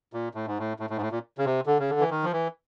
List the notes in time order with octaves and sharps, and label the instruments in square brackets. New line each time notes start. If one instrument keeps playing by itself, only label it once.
[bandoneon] A#2
A2
G#2
A2
A2
A2
G#2
A2
A#2
C#3
C3
D3
C#3
D3
E3
D#3
F3
E3